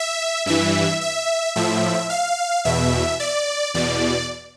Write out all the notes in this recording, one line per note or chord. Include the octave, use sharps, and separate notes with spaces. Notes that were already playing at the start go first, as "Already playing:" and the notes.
Already playing: E5
G2 E3 E5
E5
A2 F3 E5
F5
E2 B2 E5
D5
E2 B2 D5